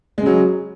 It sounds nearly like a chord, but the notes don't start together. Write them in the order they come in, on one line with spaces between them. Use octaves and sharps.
G#3 C#3 F#3